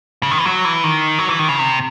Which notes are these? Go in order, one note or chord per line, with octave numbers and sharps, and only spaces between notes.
C#3
D#3
E3
F#3
E3
D#3
F#3
E3
D#3
C#3
C3